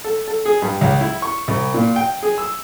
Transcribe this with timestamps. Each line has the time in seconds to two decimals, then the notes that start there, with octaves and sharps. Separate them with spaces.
0.04 A4
0.28 A4
0.46 G#4
0.62 G2
0.81 C#2
1.01 E4
1.22 C#6
1.48 C2
1.74 A#2
1.96 G5
2.23 G#4
2.38 E6